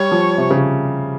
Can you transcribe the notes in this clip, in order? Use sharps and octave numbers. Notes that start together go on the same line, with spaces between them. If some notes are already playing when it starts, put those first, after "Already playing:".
Already playing: G3 C#5
F3
C3
C#3